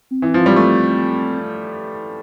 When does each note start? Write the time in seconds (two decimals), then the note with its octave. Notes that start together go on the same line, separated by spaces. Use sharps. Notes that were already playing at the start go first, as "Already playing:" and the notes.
0.11 C4
0.22 E3
0.34 F3
0.46 G3
0.56 A3